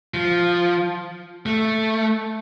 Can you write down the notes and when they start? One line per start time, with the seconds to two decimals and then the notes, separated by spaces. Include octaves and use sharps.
0.14 F3
1.46 A3